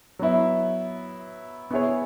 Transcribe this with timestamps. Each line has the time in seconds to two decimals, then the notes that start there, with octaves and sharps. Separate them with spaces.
0.19 F#3 B3 E4
1.71 B3 E4 G#4 C#5